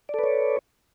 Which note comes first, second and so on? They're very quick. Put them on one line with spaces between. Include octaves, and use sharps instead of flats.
D5 A4 B4 C#5